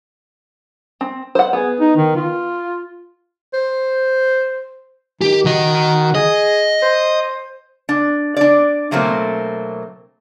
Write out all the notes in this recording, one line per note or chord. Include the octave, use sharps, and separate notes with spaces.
C4
C5 F#5
B3 G#4
D#4
D#3
F4
C5
D#3 G4
D#3 F#4 D#5
G#4 D#5
C5
D4
D4 D5
B2 F#3 A3 A#3 C4